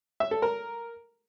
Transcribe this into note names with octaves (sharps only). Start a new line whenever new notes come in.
E5
A4
A#4